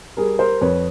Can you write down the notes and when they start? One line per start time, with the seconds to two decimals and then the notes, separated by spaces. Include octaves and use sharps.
0.17 G3 G#4 A#4
0.39 A#4 C5
0.61 F2 B4 C#5